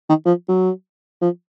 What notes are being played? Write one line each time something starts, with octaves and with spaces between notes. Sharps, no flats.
D#3
F3
F#3
F3